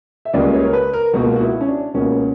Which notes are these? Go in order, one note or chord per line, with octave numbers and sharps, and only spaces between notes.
E5
C#2 C#3 G3 A#3 D5
C#5
A#4
B4
A#4
C#2 B2 A#3 F#4
F#4
E4
C#4
D4
C#2 B2 A#3 C#4